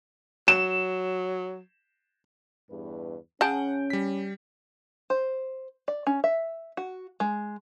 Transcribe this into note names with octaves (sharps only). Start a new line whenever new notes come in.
F#3 E7
E2 G2 B4
C#3 C#4 G#4 F#5 A5 G6 D7
G3 B6
C5
D5
C#4
E5
F#4
G#3